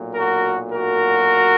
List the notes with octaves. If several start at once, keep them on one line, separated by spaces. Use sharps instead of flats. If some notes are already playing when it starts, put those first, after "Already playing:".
Already playing: B1 A#2 F#3
F#4 A#4
F#4 A#4